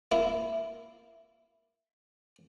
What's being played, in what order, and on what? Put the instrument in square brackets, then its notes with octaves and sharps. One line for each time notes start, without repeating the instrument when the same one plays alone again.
[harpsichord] A#3 E4